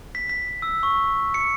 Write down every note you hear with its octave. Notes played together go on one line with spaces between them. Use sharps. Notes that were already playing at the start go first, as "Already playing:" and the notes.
B6
B6
E6
C#6
C#7